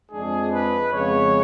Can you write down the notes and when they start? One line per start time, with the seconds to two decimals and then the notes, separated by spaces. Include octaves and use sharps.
0.12 F2 F3 G#3 D4 G#4
0.53 B4
0.93 F2 C#3 G#3 B3 C#5